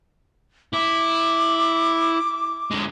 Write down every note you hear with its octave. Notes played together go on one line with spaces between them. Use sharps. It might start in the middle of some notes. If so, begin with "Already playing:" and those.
E4 D6
D3 G#3